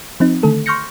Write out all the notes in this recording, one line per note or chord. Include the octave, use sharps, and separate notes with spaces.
F3 C4 D#4
D3 D#3 A3 A4
C6 C#6 F6 G6 A#6 C#7